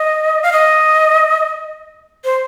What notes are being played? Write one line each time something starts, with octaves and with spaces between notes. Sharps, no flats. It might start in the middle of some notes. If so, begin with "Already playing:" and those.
Already playing: D#5
F5
D#5
C5